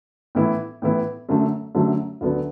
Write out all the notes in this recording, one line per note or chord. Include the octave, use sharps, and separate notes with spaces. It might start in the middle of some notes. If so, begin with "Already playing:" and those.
A2 E3 B3 E4
A2 E3 B3 E4
F#2 D3 F#3 A3
F#2 D3 F#3 A3
D2 D3 F#3 B3 D4